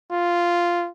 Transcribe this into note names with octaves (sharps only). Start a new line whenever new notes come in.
F4